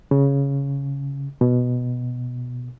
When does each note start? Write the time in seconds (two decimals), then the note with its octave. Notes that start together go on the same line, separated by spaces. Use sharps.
0.11 C#3
1.41 B2